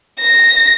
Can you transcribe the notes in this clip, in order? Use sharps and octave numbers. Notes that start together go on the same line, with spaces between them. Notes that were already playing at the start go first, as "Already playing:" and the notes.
A#6